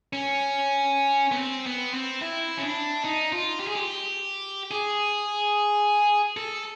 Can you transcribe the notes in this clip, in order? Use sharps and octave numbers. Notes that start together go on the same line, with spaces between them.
C#4
B3
C4
B3
C4
E4
C#4
D4
D#4
F4
G4
G#4
G4
G#4
A4